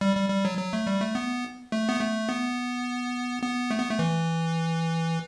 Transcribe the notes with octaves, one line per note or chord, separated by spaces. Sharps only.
G3
G3
G3
F#3
F#3
A3
G3
A3
B3
A3
B3
A3
B3
B3
A3
B3
A3
E3